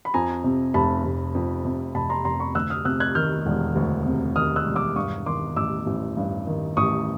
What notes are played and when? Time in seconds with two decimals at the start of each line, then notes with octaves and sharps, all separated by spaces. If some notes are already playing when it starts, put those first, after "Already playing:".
0.05 B5
0.14 F2 G#5 A#5
0.44 C3
0.74 F1 A5 B5
1.04 F1
1.35 F2
1.65 C3
1.95 F1 A5 B5
2.10 A#5 C6
2.25 F1 A#5 C6
2.40 B5 C#6
2.55 D2 E6 F#6
2.70 D#6 F6
2.85 C3 E6 F#6
3.00 F#6 G#6
3.15 D#3 F6 G6
3.46 E1
3.75 D2
4.06 C3
4.36 D#3 D#6 F6
4.56 E6 F#6
4.66 E1
4.76 D6 E6
4.96 G2 C#6 D#6
5.26 D#3 C6 D6
5.56 A1 D6 E6
5.87 A1
6.17 G2
6.47 D#3
6.77 A1 C#6 D#6